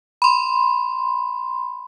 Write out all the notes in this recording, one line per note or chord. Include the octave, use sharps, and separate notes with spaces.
B5 C6